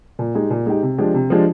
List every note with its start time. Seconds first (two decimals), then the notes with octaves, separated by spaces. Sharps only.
0.19 A#2
0.35 G#3 D#4 G4
0.50 A#2
0.66 G#3 D#4 G4
0.82 C3
0.98 F3 G#3 D4 G4
1.14 C3
1.30 F3 G#3 D4 G4